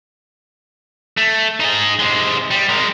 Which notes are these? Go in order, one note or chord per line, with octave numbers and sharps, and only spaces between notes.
A3
D#4 G#4
C3 G#3
G3
G#3 A#4